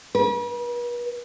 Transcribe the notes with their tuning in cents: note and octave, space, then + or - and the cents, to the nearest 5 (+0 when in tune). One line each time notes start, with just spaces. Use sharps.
B4 -40